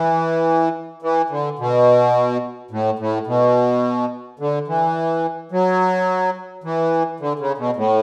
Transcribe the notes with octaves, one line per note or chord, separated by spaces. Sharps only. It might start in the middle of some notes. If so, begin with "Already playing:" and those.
Already playing: E3
E3
D3
B2
A2
A2
B2
D3
E3
F#3
E3
D3
C#3
B2
A2